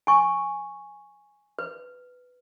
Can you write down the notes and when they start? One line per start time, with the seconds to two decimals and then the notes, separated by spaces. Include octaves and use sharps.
0.07 G#5 C#6
1.59 B4